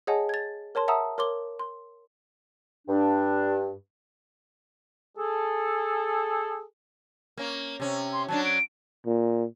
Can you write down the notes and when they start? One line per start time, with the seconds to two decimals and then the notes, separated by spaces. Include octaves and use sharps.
0.07 G#4 C#5 D#5 F#5 G#5 A5
0.29 G#6 A6
0.75 A#4 C#5 A5 C6
0.88 E5 F#5 A5 A#5 D#6 E6
1.18 A#4 C#5 C6 D6 G7
1.59 C6
2.87 G2 D4
5.17 G#4 A4
7.37 A#3 C#4
7.80 C3 C#4
8.13 C6
8.28 F#3 C#4 D4 A5
8.45 D7
9.06 A#2